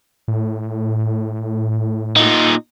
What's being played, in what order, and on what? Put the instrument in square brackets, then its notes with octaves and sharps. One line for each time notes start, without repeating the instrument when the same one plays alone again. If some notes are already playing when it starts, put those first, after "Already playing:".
[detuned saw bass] A2
[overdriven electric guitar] A#2 D#4